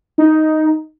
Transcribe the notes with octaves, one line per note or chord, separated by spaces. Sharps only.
D#4